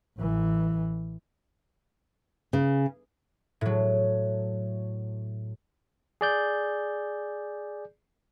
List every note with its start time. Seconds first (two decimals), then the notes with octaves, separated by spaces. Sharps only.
0.18 A1 E3
2.53 C#3
3.61 A2 F#3
6.21 G#4 D5 G6